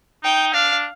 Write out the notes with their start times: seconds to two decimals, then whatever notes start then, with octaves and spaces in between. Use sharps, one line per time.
0.24 D#4 G5
0.53 D4 F5